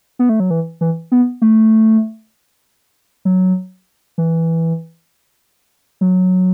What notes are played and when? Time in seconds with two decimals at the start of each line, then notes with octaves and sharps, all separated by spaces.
0.19 B3
0.29 A3
0.40 F#3
0.50 E3
0.81 E3
1.12 B3
1.42 A3
3.25 F#3
4.18 E3
6.01 F#3